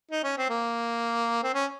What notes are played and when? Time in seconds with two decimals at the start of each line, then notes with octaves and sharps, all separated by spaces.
0.11 D#4
0.24 C#4
0.37 C4
0.49 A#3
1.43 C4
1.54 C#4